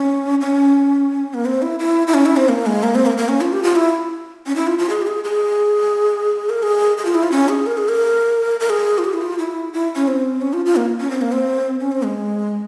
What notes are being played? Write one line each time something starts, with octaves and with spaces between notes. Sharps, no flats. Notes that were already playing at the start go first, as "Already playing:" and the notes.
Already playing: C#4
C#4
A#3
C4
E4
E4
E4
C#4
E4
C4
A#3
G#3
A#3
C4
A#3
A#3
C#4
F4
G4
F4
E4
C#4
E4
F4
F4
G#4
G4
G#4
G#4
A#4
G#4
G#4
F4
E4
F4
C#4
G#4
A#4
G#4
A#4
A#4
G#4
F4
G4
E4
F4
E4
E4
C#4
C4
C#4
F4
F4
A#3
C#4
C4
A#3
C4
C#4
C4
G#3